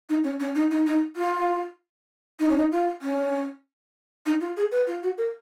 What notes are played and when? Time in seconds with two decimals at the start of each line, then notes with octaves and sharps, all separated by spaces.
0.09 D#4
0.24 C#4
0.40 C#4
0.55 D#4
0.71 D#4
0.86 D#4
1.16 F4
2.40 D#4
2.49 C#4
2.57 D#4
2.72 F4
3.02 C#4
4.26 D#4
4.40 F4
4.57 G#4
4.71 B4
4.87 F4
5.03 F#4
5.18 A#4